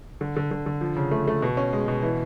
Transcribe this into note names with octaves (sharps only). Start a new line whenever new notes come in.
D3
D3
D3
D3
F3
C#3
A3
A3
B2
C#4
G#3
B2
E3